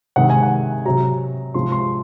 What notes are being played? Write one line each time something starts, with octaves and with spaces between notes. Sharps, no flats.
C3 D#3 G#3 F#5
G#5
F#5
C3 F#3 A#5
C3 F3 G#3 C6
C6